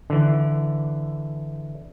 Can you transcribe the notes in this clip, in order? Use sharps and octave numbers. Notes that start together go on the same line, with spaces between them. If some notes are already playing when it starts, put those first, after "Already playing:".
D3 E3